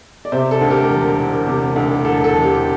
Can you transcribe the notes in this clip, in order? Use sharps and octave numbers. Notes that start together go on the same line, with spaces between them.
D5
C3 C5 E5
A4
D2
G4 A#4
E1
E1
C3
D2
E1 A4
A4
E1
G4